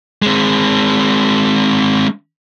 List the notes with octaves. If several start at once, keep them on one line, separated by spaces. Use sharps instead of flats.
G#3 C4